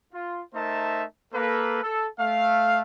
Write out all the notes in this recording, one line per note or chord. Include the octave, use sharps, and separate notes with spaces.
F4
A3 D#4 A#4 C5 E5 A5
A#3 A4 B4
A4
A3 F5